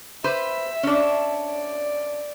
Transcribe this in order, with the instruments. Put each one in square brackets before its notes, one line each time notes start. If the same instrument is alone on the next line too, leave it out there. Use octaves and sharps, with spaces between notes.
[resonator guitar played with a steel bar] B4 C5 [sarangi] E5
[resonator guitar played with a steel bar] C#4 D4
[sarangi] D5